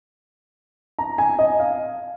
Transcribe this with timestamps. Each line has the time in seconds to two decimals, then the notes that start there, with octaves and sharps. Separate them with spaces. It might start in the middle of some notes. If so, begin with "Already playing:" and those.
0.99 A#5
1.18 G#5
1.39 D#5
1.60 F5